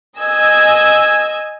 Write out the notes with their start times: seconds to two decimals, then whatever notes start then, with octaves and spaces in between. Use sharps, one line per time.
0.18 D#5 G#5 E6 G#6